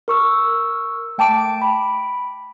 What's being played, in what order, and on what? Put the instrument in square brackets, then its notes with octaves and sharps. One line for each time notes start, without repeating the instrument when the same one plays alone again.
[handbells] A#4 C#6 E6
A3 G5 A5 D6 D7
B5